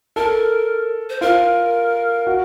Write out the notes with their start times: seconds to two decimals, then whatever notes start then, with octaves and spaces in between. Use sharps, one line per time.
0.16 A4 A#4
1.10 C5
1.21 F4 A#4
2.27 F#4